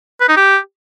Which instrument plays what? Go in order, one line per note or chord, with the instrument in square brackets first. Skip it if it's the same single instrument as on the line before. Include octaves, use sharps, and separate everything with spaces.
[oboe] B4
D#4
G4